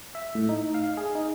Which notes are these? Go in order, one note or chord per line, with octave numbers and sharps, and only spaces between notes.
E5
A2
D#4
F5
G#4
D#4